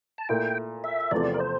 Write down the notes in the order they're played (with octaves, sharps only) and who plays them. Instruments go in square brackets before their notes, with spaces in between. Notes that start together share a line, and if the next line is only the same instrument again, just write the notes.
[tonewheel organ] A5
[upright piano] A#2 A3 E4 [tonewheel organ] G5
[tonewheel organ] E5
[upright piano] E2 C3 F3 A3 C4 [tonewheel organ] D5
[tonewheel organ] A#4
C5